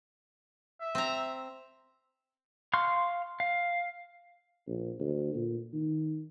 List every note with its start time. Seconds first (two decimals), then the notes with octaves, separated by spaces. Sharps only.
0.81 E5
0.95 C4 A#5
2.73 F5 C6 C#6 F6
3.40 F5
4.67 A#1
5.00 D2
5.35 A#2
5.73 D#3